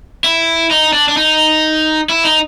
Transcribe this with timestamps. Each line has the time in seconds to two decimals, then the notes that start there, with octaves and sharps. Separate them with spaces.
0.24 E4
0.71 D#4
0.93 D4
1.09 D4
1.17 D#4
2.09 E4
2.24 D#4